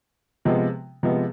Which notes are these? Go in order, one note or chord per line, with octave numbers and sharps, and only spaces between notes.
C3 F3 G#3 B3
C3 F3 G#3 B3